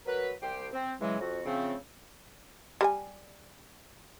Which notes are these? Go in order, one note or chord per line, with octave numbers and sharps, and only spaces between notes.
F#3 A#4 B4
C2 G4 C5 G5
C4
C#3 E3 F#3 G#3
F2 F#4
C#3 F3 A3 C4
G3 A#4 G#5